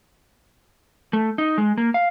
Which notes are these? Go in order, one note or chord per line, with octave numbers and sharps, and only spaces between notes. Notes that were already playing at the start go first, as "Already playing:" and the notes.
A3
D#4
G#3
A#3
F5